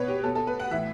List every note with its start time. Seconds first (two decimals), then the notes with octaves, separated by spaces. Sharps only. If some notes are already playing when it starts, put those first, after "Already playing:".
Already playing: B2 B4 C#5
0.08 G4
0.24 B2 A4
0.35 A4
0.47 B4
0.60 F#5
0.71 A2 E3 E5